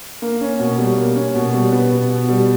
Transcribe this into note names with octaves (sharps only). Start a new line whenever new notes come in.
A#3
C#4
B2
G3
A#3
C#4
B2
G3
B3
B2
B2
G3